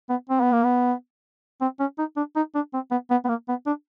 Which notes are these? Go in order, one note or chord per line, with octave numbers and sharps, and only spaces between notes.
B3
C4
B3
A#3
B3
C4
C#4
D#4
D4
D#4
D4
C4
B3
B3
B3
A#3
B3
D4